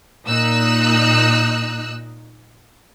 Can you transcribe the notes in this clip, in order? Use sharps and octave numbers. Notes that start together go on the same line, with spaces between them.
A#2 D#4 E6 F#6